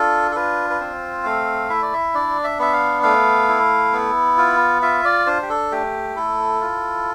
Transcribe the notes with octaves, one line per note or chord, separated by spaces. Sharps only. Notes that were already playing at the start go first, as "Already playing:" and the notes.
Already playing: D4 F4 A4
A4
F4 B4
B4
C4 C5
A3 F5
E4 E5
D5
E5
D4 D5
E5
B3 E5
F5
A3 F5
E4
B3
F4
F4 E5
D5
D4 C5
G4
A4
A3 G4
E4 A4
F4